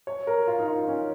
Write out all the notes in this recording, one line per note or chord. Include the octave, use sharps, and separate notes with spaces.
C#5
A#4
F4
D#4
F4
C#4